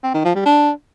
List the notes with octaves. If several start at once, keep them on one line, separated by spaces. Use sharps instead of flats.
C4
D#3
F3
G3
D4